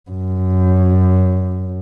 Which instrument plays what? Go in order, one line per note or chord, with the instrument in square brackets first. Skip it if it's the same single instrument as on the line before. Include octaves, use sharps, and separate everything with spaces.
[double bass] F#2